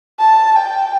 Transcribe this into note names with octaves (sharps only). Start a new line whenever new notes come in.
A5
G5